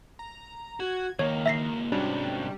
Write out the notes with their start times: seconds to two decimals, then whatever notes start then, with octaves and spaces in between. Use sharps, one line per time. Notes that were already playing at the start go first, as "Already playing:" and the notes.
0.19 A#5
0.80 F#4 G#6
1.19 C#2 D#3 A#3 C#5
1.46 E5 A#6 C7
1.92 G#2 C3 G3 C#4 D4 F#4